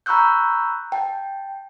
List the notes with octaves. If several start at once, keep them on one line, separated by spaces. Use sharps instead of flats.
A#5 B5 C#6 E6 F#6 G6
G5 A5